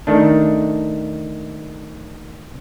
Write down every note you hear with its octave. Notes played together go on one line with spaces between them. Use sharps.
D#3 A3 D4